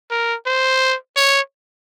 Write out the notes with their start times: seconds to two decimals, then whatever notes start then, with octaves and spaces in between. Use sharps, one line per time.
0.11 A#4
0.46 C5
1.16 C#5